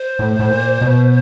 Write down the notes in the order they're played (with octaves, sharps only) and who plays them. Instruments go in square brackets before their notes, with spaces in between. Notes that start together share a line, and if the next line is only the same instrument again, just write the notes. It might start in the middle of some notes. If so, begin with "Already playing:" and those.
Already playing: [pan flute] C5
[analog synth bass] A2
A2
A#2
B2